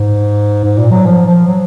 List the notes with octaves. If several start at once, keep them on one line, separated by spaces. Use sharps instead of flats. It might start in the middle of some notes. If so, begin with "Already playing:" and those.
Already playing: G#2
G#2
A#2
F#3
F3
F3
F#3